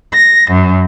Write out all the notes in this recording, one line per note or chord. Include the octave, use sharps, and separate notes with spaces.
A#6
F#2